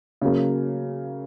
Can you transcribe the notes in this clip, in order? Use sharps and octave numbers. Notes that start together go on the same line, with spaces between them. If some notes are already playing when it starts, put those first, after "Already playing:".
C#3 F#3 A#3